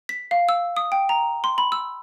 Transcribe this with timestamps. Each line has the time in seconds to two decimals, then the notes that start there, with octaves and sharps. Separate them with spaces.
0.09 B6
0.31 F5
0.49 E6
0.77 D#6
0.92 G5
1.09 A#5
1.44 C6
1.58 B5
1.72 E6